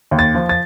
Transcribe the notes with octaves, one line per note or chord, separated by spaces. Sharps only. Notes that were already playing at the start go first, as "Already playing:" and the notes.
D#2
A6
F3
A6